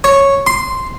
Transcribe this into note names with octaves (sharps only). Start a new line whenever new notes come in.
C#5
C6